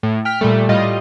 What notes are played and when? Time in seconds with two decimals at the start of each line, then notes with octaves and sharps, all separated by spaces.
0.03 A2
0.25 G5 F6 B6
0.41 A#2 G3 A3
0.69 A2 G3 F4 D#5